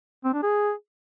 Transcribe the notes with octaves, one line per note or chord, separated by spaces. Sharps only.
C4
D4
G#4